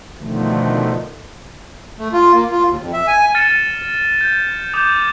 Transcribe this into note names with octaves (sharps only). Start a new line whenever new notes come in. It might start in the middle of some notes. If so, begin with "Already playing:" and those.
B2 D3 D#3 F3 A3
A3
F4
A#3
F4
D#2
F2
E5
G#5
F6 A6 C#7 D#7 E7
G6
D6 D#6 G6